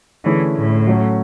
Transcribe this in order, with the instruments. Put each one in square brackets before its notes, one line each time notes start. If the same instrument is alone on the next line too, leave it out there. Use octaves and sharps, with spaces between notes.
[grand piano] D3 A3 C#4 E4 G#4 [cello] E3
[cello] A2
[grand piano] F#3 A3 C#4 F#4